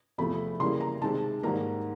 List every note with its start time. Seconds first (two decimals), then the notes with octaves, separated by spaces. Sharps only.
0.18 E2 C3 F3 A3 B5
0.59 C#3 E3 G3 A#3 C6
0.80 A#5
1.02 C3 D#3 G#3 C4 A5
1.43 G#2 D#3 G3 A#3 A#5